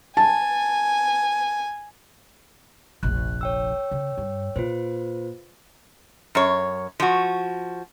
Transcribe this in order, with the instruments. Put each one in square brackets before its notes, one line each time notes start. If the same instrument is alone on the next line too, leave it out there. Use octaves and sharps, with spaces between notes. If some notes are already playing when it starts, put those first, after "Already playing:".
[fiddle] G#5 [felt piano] A5
[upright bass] F1 A#1 [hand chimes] F#6
[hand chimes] C#5 G5 E6
[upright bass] C#3
G2
[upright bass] A#2 [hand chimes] F4 B4 C5
[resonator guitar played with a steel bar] F#2 C#5
F3 F#4